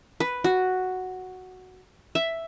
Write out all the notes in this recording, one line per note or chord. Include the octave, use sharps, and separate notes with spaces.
B4
F#4
E5